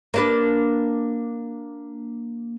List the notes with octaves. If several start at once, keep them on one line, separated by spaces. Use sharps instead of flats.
A#3 D4 B4